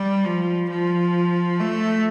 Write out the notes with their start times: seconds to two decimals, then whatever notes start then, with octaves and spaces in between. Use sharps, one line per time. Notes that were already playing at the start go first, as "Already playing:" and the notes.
Already playing: G3
0.25 F3
0.70 F3
1.60 A3